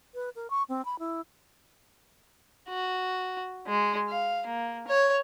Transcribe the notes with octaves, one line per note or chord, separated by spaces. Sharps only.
B4
A#4
C#6
C4
B5
E4
F#4
G#3
F5
A#3
C#5